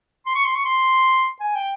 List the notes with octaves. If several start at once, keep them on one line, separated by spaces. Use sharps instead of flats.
C6
C#6
C6
C#6
C6
G#5
G5